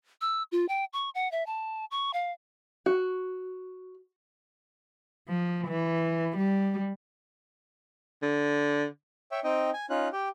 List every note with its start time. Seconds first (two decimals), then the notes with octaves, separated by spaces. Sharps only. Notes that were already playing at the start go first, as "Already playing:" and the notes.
0.21 E6
0.52 F4
0.69 G5
0.93 C#6
1.15 F#5
1.32 E5
1.46 A5
1.91 C#6
2.14 F5
2.86 F#4
5.28 F3
5.67 E3
6.37 G3
8.22 D3
9.32 C#5 E5 G5
9.44 C4 D#4 D#5 G5
9.74 G#5
9.90 C#4 D#4 F4 F#6
10.13 G4 G5